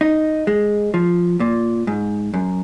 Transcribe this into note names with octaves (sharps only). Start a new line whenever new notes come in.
D#4
G#3
F3
A#2
G#2
F#2